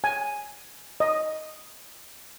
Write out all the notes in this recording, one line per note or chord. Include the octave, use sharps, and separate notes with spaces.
G#5
D#5